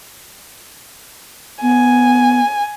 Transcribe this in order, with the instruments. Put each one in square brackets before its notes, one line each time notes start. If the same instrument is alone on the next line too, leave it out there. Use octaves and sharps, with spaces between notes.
[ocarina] B3 [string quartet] G#5